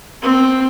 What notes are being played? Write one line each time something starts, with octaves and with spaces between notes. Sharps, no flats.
C4